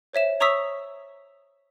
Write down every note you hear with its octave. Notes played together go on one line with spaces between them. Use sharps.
C5 C#5 E5 E7
C#5 A#5 C#6 D#6 E6 B6